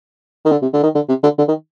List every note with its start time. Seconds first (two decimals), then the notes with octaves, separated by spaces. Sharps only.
0.45 D#3
0.52 D3
0.62 C3
0.73 D3
0.83 D#3
0.95 D3
1.09 C3
1.23 D3
1.38 D3
1.48 D#3